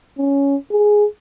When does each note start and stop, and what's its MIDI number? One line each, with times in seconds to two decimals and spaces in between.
0.18 0.56 61
0.71 1.05 68